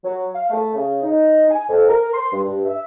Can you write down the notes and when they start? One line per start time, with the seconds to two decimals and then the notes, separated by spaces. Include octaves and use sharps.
0.04 F#3
0.35 F5
0.50 A3
0.74 C#3
1.03 D#4
1.50 G#5
1.69 F2
1.88 A#4
2.14 C6
2.32 G2
2.44 G2
2.65 E5